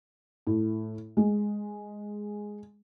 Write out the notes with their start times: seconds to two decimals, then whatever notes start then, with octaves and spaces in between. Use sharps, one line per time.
0.47 A2
1.17 G#3